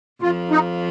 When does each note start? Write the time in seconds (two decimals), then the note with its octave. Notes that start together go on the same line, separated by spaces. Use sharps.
0.21 F2 F3 F4
0.51 D#4